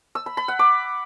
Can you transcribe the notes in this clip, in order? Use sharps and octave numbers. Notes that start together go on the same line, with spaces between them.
E6
B5
B5
F#5
D6